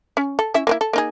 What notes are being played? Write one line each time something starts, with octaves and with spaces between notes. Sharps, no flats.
C#4
A4
C#4 E4 E5
A#3 B3 E4
A4
A#3 D#4 G#4